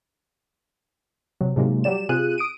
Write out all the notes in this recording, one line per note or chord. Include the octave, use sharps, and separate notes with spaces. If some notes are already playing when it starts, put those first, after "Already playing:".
C3 F#3
G#2 C3 F#3 G#3 A#3
F#3 G3 G4 D5 E7
C3 F4 G#4 F#6 D#7
D#6 D7 D#7